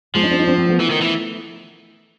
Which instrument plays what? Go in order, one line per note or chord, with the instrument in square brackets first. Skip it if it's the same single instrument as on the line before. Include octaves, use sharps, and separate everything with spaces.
[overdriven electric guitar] F3 [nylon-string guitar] G#3 A#3
[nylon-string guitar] C#4 D#4
C4 D4
C#4 D#4
C4 D4
A#3 C4
A3 B3
[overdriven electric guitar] E3
D#3
E3